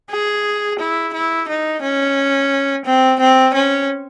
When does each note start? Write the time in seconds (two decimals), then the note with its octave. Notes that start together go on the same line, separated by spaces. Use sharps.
0.11 G#4
0.79 E4
1.13 E4
1.48 D#4
1.82 C#4
2.85 C4
3.20 C4
3.54 C#4